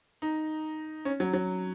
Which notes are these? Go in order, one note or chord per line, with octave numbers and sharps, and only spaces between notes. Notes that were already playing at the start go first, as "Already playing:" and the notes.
D#4
C#4
F#3
F#3